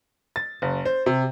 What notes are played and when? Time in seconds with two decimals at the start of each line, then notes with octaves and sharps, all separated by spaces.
0.36 A6
0.62 F#1
0.85 C5
1.06 C3